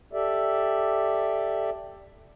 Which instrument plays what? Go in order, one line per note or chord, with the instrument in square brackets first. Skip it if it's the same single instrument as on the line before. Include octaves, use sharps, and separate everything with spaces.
[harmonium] G4 A4 D5 E5